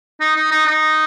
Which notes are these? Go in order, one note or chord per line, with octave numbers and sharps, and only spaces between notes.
D#4
D#4
D#4
D#4